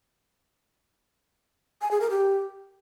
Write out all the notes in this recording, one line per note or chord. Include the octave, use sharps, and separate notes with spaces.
G#5
G#4
A#4
G4